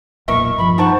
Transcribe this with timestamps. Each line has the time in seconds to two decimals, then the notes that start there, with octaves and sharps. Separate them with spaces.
0.28 E1 B1 A#2 A#4 D#5 E5 C#6
0.57 G2 F3 B5
0.78 D#3 D#4 C5 F#5 A5 C#6